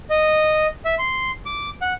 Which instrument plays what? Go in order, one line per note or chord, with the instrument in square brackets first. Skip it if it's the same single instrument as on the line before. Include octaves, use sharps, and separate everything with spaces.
[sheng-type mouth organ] D#5
E5
C6
D6
F#5